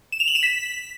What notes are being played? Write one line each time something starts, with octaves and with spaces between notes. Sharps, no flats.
E7
F7
F#7
E7
B6